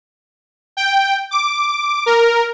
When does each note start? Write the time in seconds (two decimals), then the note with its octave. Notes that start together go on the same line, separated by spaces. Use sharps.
0.77 G5
1.31 D6
2.06 A#4